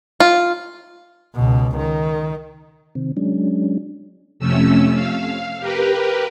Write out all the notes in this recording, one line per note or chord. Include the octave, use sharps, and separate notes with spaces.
F4
C#2 B2
D#3
C3 D#3 C4
F#3 G#3 C#4 D4
F2 C3 A3 C#4 E6
F5
G4 A#4 B4